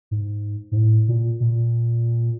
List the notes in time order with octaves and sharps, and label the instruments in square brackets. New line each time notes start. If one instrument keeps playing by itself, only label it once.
[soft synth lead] G#2
G#2
A2
A#2
A#2